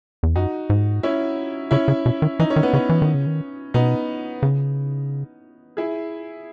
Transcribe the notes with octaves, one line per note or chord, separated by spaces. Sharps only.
E2
F#2 D#4 F#4
G#2
C#4 E4
C#3 C#4 E4
C#3
B2
D#3
E3 D#4
C#4
D#3
B3
C#3 C#4
E3
D#3
C#3
D#3
B2 B3 D#4
C#3
E4 G#4